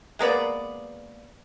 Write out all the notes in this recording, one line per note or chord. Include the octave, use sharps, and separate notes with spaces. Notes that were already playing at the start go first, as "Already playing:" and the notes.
G#3 A#3 B3 D5